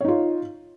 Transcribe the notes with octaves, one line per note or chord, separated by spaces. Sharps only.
D#4 F4 C#5